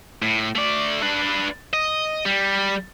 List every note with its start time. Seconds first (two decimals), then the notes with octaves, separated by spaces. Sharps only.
0.22 A2
0.56 A3 D5
1.02 D4 B4
1.73 D#5
2.26 G3